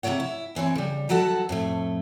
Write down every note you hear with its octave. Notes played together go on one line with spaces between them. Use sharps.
G#2 C3 E3 F#3 C#5 F#5
E4
D2 E3 C4 C#5
C#3 G3
D#3 F#3 F#4 A4 F#5 A5
F2 A2 A3